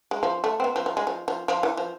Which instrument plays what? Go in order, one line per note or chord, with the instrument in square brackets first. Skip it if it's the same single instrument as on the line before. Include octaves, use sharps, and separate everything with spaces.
[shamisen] G#3
F3
A3
C4
B3
F3
F3
G#3
F3
F3
F3
E3
F3